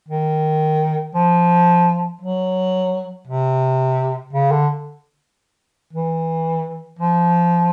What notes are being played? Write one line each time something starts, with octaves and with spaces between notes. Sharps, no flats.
D#3
F3
F#3
C3
C#3
D3
E3
F3